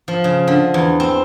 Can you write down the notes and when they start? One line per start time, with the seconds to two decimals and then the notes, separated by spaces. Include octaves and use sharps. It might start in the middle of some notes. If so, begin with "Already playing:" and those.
0.08 F3
0.24 C#3
0.48 D3
0.74 E2
1.00 C4